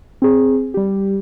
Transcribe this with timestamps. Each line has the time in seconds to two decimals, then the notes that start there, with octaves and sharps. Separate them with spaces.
0.22 C4 G#4
0.74 G3 G4